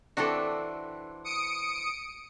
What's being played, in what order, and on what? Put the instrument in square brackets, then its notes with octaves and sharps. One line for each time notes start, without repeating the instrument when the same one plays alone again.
[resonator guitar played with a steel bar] E3 C4 D4 [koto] F#4 A4
[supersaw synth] D#6 C#7 D7